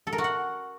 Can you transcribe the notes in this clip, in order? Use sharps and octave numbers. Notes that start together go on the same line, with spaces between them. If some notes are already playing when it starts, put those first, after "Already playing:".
A4
A#4
F#4
F#5